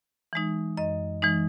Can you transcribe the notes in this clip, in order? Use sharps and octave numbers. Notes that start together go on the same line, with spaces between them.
E3 G#3 D#4
F#2 D#5
E3 G#3 D#4